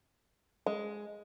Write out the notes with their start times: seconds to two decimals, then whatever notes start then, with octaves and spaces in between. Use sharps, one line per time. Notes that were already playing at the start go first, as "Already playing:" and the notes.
0.66 G#3